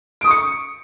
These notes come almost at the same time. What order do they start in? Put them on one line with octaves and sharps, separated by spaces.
D7 D#6 C#6 C#7